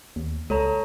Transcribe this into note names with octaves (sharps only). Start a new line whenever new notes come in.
D#2
C#2 A4 C#5 A#5